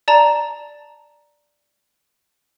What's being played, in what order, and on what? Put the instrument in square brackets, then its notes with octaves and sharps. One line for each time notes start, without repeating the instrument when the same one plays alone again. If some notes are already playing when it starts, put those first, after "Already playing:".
[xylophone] D5 A5 A#5